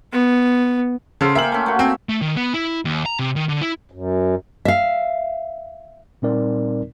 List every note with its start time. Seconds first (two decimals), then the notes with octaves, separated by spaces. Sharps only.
0.12 B3
1.21 C#3 A4 C5 F5
1.35 A#3 E5 G5 G#5 F#7
1.52 A3 C#4
1.66 A3 A#3 F#4
1.79 C4 G#5
2.09 A3
2.21 D#3
2.36 B3
2.54 E4
2.85 D#2
3.06 A#5
3.19 C3
3.36 D#3
3.49 D3
3.62 E4
3.91 F#2
4.65 E5 F5
6.22 A#2 G3 C4 D#4 A#4 D5